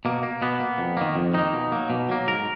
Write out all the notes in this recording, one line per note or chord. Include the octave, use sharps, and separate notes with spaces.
B2 A#3
A#3
B2 B3
A#3
F2
D#3 A#3
F2
D#3 A#3 D#4
B2
F#3 A#3
B2
F#3 A#3
G#2 A#4